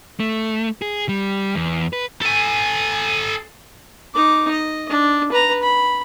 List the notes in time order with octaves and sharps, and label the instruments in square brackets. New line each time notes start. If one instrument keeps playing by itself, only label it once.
[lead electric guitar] A3
G#4
G3
E2
B4
[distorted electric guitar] A4 G#5
[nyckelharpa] D#4 D6
D#5
D4
B4 A#5
B5